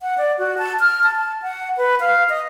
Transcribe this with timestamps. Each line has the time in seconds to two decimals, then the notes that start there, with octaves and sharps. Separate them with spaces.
0.02 F#5
0.18 D5
0.39 F#4
0.58 A5
0.80 F6
1.03 A5
1.16 A5
1.42 F#5
1.77 B4
2.00 F5
2.29 D#5